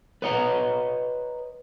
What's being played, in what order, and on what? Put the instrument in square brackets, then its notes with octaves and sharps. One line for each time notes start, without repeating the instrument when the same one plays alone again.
[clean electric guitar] B4 C#5 D#5 F#5 A5 A#5